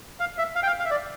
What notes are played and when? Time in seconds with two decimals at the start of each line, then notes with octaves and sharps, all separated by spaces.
0.20 F5
0.38 E5
0.56 F5
0.63 G5
0.67 F5
0.79 F5
0.85 E5
0.91 D5